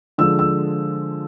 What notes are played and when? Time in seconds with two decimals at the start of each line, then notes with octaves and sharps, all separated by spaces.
0.18 D3 F3 G#3 E6
0.39 E6